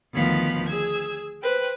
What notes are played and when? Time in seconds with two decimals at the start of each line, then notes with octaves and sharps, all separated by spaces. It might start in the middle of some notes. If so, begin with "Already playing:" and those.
0.13 D2 D#3 F3 B3 F5 B5
0.67 G#4 E6 G#6
1.42 B4 C5 G5